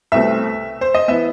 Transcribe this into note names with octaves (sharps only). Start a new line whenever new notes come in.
C2 B2 A3 C4 E5
C5
D#5
E3 B3 E5